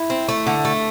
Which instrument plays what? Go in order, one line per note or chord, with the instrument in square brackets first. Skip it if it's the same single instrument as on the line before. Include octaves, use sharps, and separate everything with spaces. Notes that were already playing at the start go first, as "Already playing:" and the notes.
Already playing: [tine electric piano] E4
[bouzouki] C4
A3
D3
A3